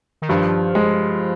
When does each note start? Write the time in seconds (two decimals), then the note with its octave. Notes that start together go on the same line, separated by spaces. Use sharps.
0.22 D#3
0.29 G2 F3
0.75 G#3